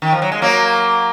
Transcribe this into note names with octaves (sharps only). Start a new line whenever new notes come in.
D#3
F3
F#3
G#3
F#3 A#3